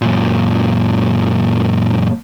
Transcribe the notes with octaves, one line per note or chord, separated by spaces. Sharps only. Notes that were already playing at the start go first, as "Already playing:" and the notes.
F#2 A#2